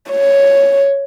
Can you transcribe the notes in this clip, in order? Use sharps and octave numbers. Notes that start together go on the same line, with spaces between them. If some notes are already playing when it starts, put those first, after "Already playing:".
C#5